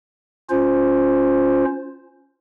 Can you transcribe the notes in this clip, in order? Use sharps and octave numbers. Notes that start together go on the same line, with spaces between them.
C#4 F4 C5